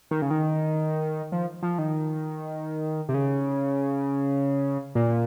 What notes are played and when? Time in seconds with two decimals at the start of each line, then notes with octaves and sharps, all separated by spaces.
0.11 D#3
0.22 C#3
0.31 D#3
1.32 F3
1.63 F3
1.78 D#3
3.09 C3
3.14 C#3
4.95 A#2